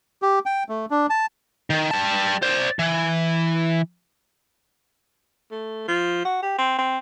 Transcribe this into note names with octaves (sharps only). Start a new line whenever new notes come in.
G4
G5
A3
D4
A5
D#3
G3 A5
C5 D5
E3
A3
F3
F#4
G4
C4
C4